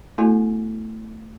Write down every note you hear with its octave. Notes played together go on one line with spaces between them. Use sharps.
A3 B3 E4 F#4 A4 G#5